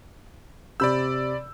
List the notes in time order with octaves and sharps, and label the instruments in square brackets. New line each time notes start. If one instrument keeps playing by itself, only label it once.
[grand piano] C3 G6 [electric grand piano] D5 B5 E6